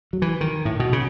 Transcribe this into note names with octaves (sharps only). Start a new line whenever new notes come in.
F#3
E3
D#3
A2
B2
C#3